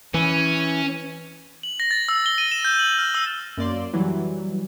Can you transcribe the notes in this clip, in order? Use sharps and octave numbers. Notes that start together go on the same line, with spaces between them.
E3 C#4
F#7
A#6
A6
E6
G7
D#7
E7
G6
F#7
F6
E6
F#2 A#3 D5 C6
E3 F#3 G3